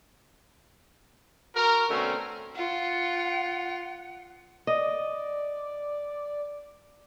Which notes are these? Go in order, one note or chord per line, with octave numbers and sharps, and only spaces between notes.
F#4 A#4
B2 D3 A3 C4 C#4
F4 F#5
D5 D#5